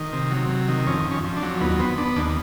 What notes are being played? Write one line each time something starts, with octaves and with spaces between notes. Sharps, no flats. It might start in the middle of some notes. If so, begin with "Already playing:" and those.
Already playing: D#3
C3
F#3
C3
D#3
F2 C#4
F2
C#4
F2
D4
F#3
D#2 B3
B3 C4
B3 D4
D#2 D4